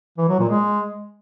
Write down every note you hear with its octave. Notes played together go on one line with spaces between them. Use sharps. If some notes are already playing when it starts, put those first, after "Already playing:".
E3
F#3
A#2
G#3